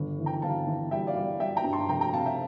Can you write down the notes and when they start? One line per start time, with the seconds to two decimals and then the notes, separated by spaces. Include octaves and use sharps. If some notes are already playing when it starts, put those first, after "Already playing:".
Already playing: G1
0.19 E3
0.26 G5 A#5
0.42 G1 F5 A5
0.67 E3
0.91 G3 E5 G5
1.07 D5 F5
1.16 G3
1.40 G3 E5 G5
1.57 G5 A#5
1.64 G2
1.73 A5 C6
1.89 F1 G5 A#5
2.01 G5 A#5
2.13 C3 F5 A5
2.26 E5 G5